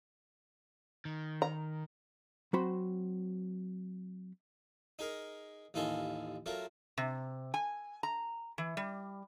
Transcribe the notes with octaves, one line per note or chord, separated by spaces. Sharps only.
D#3
A#5
F#3 C4 F#4 C5 B5
D#4 G#4 A#4
A1 D#2 D#4 F4 A4 G#5
F#3 A3 F4 A#4
C3
G#5
A#5
E3
G3